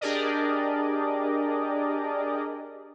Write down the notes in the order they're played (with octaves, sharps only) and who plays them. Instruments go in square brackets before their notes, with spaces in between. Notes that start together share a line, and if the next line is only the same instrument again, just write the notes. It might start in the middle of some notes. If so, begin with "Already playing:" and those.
[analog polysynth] D4 G4 G#4 A#4 D5 D#5